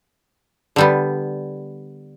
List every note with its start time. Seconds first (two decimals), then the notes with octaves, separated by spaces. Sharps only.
0.76 D3 G3 B3